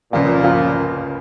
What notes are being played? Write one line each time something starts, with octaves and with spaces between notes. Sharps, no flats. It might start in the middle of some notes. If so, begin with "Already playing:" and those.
C#2 A#2 C#3 F3 A#3 F4
C#3 F3 A#3 F4